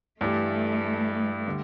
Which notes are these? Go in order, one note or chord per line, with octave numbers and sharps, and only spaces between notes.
G2 E3 G3 A3
D3 G3